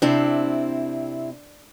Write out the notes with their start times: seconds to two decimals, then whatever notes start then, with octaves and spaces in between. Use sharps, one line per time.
0.02 C3 C4 D4 E4